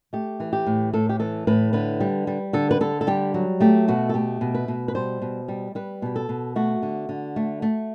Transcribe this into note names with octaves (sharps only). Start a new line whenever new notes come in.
A3 G4
E3
G4
A2
A2 A4
G4
E3 A4
A2 B4
D3 B4
G3
G3
D3 A4
B4
D3 A4
A4
G3 G4
F#3
A3 G4
B2 F#4
A4
A3 G4
B2
B4
B2
B4
G3 C5
B2
G3
G3 B4
B2 G4
A4
B2
A3 F#4
D3
D3
A3
A3